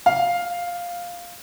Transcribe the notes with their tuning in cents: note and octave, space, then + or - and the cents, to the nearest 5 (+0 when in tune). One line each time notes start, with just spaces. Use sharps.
F5 +5